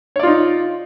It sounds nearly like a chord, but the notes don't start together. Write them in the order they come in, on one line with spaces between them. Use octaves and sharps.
C#5 D5 F4 D#4